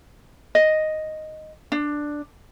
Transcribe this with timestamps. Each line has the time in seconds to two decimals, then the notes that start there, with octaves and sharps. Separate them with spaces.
0.55 D#5
1.72 D4